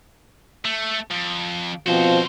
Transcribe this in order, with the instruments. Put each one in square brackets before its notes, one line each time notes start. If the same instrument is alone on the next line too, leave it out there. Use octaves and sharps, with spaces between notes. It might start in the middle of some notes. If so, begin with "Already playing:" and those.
[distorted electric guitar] A3
F2
[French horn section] B2 F3 C4 [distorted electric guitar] F#4 C5